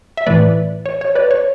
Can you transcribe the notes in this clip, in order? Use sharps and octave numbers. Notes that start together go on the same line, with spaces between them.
E5
A2 E3 A3 B4 D5
C#5
C#5
B4 D5
C#5